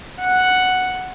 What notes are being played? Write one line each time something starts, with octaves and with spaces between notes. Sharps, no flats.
F#5